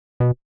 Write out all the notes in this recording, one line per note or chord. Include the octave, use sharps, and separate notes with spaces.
B2